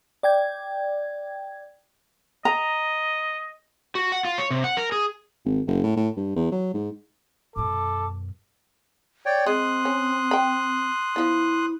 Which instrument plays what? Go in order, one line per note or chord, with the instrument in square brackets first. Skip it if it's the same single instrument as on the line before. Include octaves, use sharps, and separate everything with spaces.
[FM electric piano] D5 G5 G#6
[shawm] D#5 [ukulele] A#5
[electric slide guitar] F#4
F#5
F4
C#5
C3
F#5
A#4
G#4
[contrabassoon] G#1
F#1
A2
A2
G2
E2
F#3
G#2
[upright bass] F#2 B2 [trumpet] A4 [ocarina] D6
[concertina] C#5 D5 G5
[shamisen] G#3 [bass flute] C4 [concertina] C6 D#6 F#6
[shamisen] C#4
G5 B5
[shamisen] F3 B3 [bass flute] E4